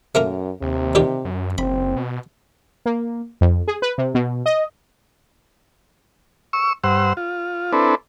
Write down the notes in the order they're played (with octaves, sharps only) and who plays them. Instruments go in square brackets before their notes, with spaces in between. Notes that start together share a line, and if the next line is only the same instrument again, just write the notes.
[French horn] F#2 [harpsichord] A3 A#3 A#4
[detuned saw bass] D#2 [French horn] C3
[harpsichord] A#2 D#3 G4
[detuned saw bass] F#2
[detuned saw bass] F#1 [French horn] C4 [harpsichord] B5
[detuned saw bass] B2
[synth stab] A#3
F2
G#4
B4
C3
B2
D#5
[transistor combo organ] C#6 E6
G2 C5 F#5 E6
F4
C4 D4 E4 A4 B4